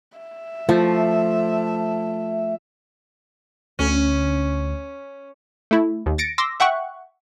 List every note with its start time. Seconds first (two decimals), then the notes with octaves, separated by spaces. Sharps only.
0.18 E5
0.69 F3 A3
3.79 D2 C#4
5.71 A3 E4
6.06 D#2
6.18 A6 A#6 C#7 D7
6.38 C6 D6 E6 A#6
6.60 E5 F#5 G5 C#6 F#6